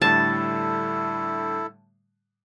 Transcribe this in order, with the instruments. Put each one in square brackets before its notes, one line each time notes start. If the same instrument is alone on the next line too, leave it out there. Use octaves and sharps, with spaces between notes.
[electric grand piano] A2 D3 G3 [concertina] E4 A4 [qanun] A5